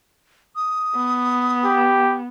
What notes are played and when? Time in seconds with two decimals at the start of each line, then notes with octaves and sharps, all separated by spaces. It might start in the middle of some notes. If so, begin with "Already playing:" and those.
0.56 D#6
0.96 B3
1.65 G4